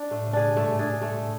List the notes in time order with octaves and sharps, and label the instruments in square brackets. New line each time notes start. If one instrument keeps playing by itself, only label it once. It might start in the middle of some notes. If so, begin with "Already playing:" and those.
Already playing: [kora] D4
[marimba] A2 [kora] A3
[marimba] C#3
[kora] D4 G#4
[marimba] B2
[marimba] G#2 [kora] A3
[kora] D4 G#4
[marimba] A2 [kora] A3
[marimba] G#2